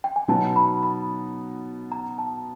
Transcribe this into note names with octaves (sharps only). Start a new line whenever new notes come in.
G5
G#5
B2 F#3 B3 D#4 A5
B5
B5
A#5
A5